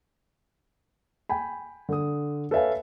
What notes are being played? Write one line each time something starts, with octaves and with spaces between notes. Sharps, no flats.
G5 G#5 B5
D3 D#6
A4 B4 C#5 E5 F5 G#5